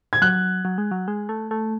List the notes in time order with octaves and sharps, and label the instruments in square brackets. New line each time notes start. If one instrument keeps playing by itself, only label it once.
[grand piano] G#6
[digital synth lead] F#3 [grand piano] F#6
[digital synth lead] F#3
G#3
F#3
G#3
A3
A3